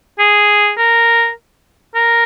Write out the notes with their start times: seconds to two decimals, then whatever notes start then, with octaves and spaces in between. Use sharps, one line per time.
0.19 G#4
0.78 A#4
1.95 A#4